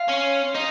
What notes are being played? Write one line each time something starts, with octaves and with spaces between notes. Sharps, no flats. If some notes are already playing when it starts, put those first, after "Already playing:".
Already playing: F4
C#4
D#4